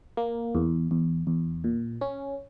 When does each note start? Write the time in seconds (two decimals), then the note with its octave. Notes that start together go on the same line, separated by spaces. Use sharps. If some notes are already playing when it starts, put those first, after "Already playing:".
0.17 A#3
0.55 E2
0.91 E2
1.27 E2
1.64 A#2
2.01 C#4